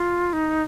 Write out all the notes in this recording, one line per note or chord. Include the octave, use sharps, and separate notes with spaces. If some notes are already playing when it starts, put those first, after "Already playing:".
Already playing: F4
D#4